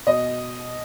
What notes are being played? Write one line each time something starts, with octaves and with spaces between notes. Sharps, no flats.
B2 D#5